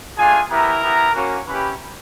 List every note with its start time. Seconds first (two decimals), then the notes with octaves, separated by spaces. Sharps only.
0.17 A3 D4 F4 G#4 G#5
0.50 B3 E4 G4 A#4 A#5
0.82 B3 E4 G4
1.14 A#3 C#4 F#4
1.46 A#3 C#4 E4 G4 B4 B5